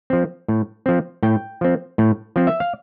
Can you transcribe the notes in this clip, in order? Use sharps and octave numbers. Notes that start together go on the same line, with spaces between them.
F3 C4
A2
F3 C4
A2 G5
F3 C4
A2
F3 C4
E5
F5